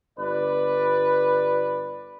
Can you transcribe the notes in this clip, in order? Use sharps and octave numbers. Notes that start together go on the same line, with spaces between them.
G1 B4 D5